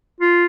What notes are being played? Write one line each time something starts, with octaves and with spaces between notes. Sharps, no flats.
F4